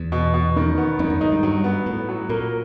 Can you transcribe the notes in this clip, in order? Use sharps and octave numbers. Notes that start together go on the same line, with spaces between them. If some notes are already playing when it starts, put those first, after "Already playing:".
Already playing: E2
B2
B2
D#3
B3
F2 D#3
F#2
G#2 D#4
G2
G2 F#3
B3
A2 B3
F#3
A#2 A#3